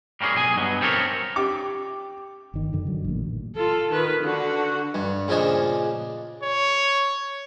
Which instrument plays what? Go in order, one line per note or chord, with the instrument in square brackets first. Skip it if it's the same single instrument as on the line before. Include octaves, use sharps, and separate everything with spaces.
[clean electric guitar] G3 A#3 C#4 F#4 G#4
B1 G#4 G#5
G2 B2 F#3 B3
C4 G4 A4 A#4 C#5
[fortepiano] G4 D6
[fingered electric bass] G1 D#3
F#2 D3 D#3
D3 F#3
A1 A#2
[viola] F4 A4
D#3 B4
D3 F#4
[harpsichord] G2
A#2 C#3 F3 D4 C#5 D#5
[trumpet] C#5